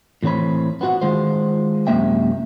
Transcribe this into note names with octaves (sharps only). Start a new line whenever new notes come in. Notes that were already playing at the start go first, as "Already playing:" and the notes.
A2 E3 C4 C#5 B5
B3 C4 F#4 F#5
D#3 G#3 F4 C5
F#2 C3 G#3 A#3 E5 G5